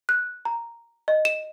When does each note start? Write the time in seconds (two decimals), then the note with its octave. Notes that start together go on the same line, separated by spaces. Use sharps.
0.09 F#6
0.45 A#5
1.08 D#5
1.25 E7